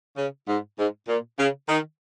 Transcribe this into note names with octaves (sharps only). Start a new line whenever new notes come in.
C#3
G#2
G#2
A#2
C#3
D#3